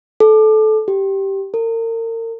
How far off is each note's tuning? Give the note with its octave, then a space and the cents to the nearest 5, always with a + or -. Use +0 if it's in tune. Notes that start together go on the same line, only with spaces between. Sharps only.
A4 -20
G4 -10
A#4 -35